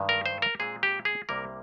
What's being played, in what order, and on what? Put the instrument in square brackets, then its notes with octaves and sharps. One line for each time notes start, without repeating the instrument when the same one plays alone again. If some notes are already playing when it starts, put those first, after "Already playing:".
Already playing: [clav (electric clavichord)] G2 D#3 G#3
A#4
C5
A#4
A#2 G#3 C4 G#4
G4
G#4
C2 C3 G3 A#3 A#4